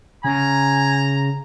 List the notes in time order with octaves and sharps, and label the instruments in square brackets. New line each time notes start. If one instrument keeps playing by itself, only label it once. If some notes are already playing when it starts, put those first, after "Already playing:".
[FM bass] C#3 [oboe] G#5 [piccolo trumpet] A#5